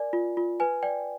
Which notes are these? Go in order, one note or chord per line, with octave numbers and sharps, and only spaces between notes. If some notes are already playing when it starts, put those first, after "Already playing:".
Already playing: A#4 D5 G#5
F4
F4
B4 G#5
D5 G5